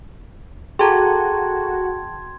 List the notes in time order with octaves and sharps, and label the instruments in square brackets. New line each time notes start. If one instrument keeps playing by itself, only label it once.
[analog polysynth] F#4 [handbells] G#4 A4 A#5 [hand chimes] G5 A5 [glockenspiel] C6 G#6